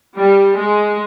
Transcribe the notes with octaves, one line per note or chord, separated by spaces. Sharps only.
G3
G#3